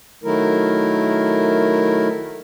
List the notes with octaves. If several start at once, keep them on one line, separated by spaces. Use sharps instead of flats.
D#3 F#3 A3 E4 A#4